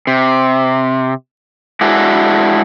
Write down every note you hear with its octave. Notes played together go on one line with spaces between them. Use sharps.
C3
G#3 D4 E4 F#4